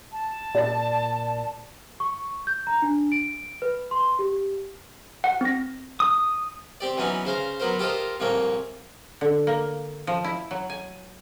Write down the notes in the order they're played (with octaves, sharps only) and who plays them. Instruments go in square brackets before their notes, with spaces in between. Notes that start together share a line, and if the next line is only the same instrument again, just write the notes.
[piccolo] A5
[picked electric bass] A#2 [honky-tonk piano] D5 A6
[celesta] C#6
G6
A#5
D4
D7
B4
C6
G4
[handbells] F#5
C4 A#6
[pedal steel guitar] D#6
[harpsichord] C4 G4 D5
E3 F#3 B3 C#4 D#4
C#3 C5 F5 A#5
F#3 B3 A#4 C5
F4 G4 A4 A#4 C5 D#5
C2 F2 A#2 A#3 C#5 G5
[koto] D3
A#3
F3
E4
F#3
G#5